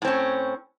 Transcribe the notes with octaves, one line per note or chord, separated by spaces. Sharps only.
A2 C4 C#4